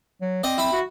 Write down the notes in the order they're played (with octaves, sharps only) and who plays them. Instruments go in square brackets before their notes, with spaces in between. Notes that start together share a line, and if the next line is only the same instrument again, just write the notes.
[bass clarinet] F#3
[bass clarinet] C4 [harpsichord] D5 D#5
[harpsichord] E4 B5
[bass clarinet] F#4